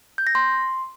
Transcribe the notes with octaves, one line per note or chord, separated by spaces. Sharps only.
G6
A#6
C6